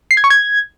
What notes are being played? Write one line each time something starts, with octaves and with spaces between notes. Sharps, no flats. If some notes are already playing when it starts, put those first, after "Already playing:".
C7
G#6
C#6
G#6